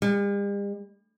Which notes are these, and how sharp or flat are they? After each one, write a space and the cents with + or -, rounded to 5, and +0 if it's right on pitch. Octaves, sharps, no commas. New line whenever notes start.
G3 +45